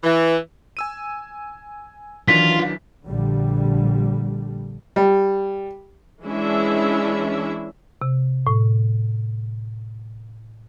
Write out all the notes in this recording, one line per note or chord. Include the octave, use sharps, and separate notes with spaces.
E3
G#5 E6 D#7
D#3 E3 F#3 D4 F4 B6
A#1 D3 G3
G3
E3 G#3 C#4 D4 E4 E5
C3
A2